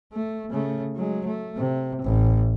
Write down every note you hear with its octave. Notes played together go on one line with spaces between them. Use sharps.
A3
C#3 A3
F#3 G#3
A3
C3
A1